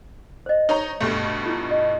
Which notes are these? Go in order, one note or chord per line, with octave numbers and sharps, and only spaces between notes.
C5 D#5
D#4 C#5 A#5
G2 B2 A3
E4 F4
D#5